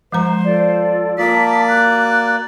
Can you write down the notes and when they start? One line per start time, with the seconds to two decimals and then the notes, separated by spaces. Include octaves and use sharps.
0.12 F3 G#3 C5 A#5
0.44 F4 A4 D5
1.18 A#3 F4 D5 A5 A#5 D#6 B6
1.68 F#4 F#6